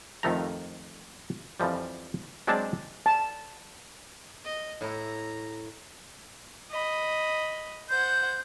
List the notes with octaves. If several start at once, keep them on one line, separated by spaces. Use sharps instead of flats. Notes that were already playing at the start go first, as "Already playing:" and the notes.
F2 D#3 F3 A3 G4 A#5
F2 E3 F3 G3
F#3 G#3 C4 D4 D5 A5
A5
D#5
A2 E4 A#5
D#5 B5
C5 F#5 G6